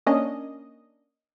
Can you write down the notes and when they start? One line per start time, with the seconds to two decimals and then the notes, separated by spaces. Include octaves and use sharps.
0.06 A#3 C#4 D4 D#5